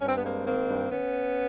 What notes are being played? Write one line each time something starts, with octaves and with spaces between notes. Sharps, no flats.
G2 C#4
C4
B3
G#3 A#3 C4
D#3 A#3 C4
G2
B3 C#4